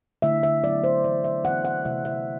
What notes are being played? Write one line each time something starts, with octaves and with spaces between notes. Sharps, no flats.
D3 A3 E4 E5
E5
F#3 B3 E4 D5
C5
E3 A3 E4 D5
E5
E3 B3 E4 F#5
F#5
C3 E3 A3 E4 E5
E5